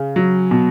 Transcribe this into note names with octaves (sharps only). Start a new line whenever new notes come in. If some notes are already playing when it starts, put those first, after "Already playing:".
Already playing: C#3
F#3
B2